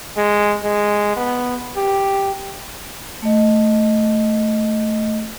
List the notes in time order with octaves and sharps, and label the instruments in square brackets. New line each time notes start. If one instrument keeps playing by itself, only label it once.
[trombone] G#3
G#3
B3
G4
[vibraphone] A3 D#5